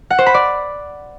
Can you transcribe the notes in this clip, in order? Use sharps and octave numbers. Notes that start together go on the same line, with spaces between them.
F#5
C5
B5
D5